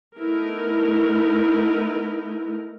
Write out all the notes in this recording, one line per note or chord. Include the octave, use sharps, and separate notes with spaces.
A3 B3 D#4 E4 A#4